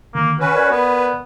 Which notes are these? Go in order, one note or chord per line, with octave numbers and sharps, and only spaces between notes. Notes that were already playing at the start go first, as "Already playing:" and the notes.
D3 D#3 A#3
C#4 F#4 B4
A#4 D5 G#6
B3 B4